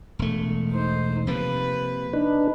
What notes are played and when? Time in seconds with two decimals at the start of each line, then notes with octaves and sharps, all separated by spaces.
0.19 E1 A3
0.72 D#4 C5
1.27 C3 F3 A#3 B4
2.13 D4 D#4 B4